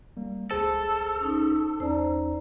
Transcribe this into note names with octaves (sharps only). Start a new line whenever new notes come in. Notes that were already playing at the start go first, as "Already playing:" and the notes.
G3 A#3
C#2 G#4 A4 C5
C#4 D#4
E2 C#4 D#4 C5 D5 A#5